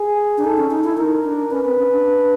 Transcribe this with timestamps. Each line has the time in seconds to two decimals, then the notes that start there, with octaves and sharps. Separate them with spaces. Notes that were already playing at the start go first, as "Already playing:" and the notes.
Already playing: G#4
0.37 D4
0.44 D#4 A4
0.58 C#4
0.71 D#4
0.84 E4
0.97 D#4 A#4
1.24 D4
1.51 C#4 B4
1.65 C4
1.78 C#4
1.91 D4